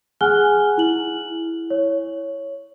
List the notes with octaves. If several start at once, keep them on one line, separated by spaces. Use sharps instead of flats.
G#4 F#5 G#5 F6 F#6 G7
E4 F#7
C#5